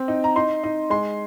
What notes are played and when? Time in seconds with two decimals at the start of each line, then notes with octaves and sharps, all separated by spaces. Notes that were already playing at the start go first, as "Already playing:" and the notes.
Already playing: C4
0.08 D#4
0.24 A#5
0.36 D#4 C6
0.64 D#4
0.90 G#3 C6